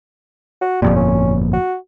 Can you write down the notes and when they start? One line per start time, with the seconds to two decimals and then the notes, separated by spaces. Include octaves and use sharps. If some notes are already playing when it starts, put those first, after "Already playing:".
0.62 F#4
0.82 G1 F2 A#2 G3
0.96 C#4
1.53 F#4